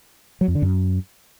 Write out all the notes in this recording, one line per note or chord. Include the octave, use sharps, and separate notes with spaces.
F#3
F2
D3
F#2